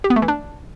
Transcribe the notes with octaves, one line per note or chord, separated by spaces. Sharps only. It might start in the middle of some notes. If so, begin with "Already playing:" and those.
G4
B3
A3
E3
D4